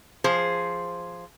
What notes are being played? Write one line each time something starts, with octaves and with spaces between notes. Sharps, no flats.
F3 G#4 C5